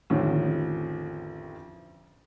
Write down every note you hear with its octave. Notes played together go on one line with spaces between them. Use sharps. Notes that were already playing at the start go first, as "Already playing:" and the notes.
A1 F2 D3 D#3